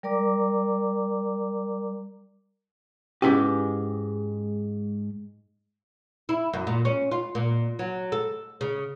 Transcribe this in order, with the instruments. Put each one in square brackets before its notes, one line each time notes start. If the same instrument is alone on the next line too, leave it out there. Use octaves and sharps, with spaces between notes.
[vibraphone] G3 A#4 D5 A#5 D6
[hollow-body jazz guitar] G#2 G#3 G4 [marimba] C#4 E4 B4
[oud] E4
F#2
A#2
C#4
F4
A#2
F#3
A4
C#3